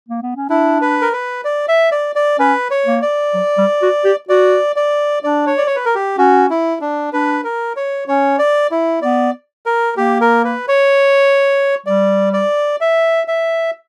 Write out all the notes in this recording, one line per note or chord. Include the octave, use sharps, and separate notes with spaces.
A#3
B3
C#4
D4 E4
B4
A#4
B4
D5
E5
D5
D5
C#4 B4
C#5
A#3
D5
F#3
G3
F#4
G4
F#4 D5
D5
D4 D5
C#5
D5
C#5
B4
A#4
G4
C#4 F#4
E4
D4
D4 B4
A#4
C#5
C#4 C#5
D5
E4
B3 D5
A#4
A#3 G4
A#4
B4
C#5
G3 D5
D5
E5
E5